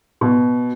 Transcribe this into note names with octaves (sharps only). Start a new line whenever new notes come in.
B2